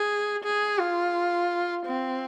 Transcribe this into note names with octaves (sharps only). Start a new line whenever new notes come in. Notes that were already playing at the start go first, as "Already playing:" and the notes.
Already playing: G#4
G#4
F4
C4